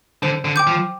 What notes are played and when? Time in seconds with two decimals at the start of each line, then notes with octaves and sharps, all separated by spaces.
0.23 D3 C5
0.45 D3
0.56 G5 D6 G6
0.67 F3